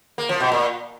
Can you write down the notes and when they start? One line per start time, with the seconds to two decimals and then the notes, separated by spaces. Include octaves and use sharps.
0.18 A#3
0.29 F3
0.40 B2
0.52 A#2